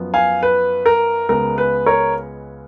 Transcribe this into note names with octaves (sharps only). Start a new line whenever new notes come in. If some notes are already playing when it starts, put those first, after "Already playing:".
Already playing: F#2 F3 B3
F5 G#5
B4
A#4
C#2 C#3 G#3 B3 A#4
B4
A#4 C#5